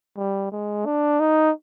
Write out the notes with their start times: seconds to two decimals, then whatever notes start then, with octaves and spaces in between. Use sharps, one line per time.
0.17 G3
0.51 G#3
0.86 D4
1.20 D#4